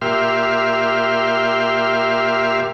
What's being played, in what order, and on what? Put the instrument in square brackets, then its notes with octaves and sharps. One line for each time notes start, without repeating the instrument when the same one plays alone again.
[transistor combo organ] A#2 G4 E5 C6 F6